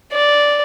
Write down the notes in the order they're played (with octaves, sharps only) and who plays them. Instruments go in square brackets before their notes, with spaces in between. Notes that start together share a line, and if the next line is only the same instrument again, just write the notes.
[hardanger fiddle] D5